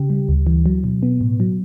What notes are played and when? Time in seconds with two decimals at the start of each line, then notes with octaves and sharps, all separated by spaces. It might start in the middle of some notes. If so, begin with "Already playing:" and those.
Already playing: C#3 G4
0.10 G3
0.29 D2
0.47 E3
0.66 F#3
0.84 B2
1.03 B3
1.21 A2
1.40 F#3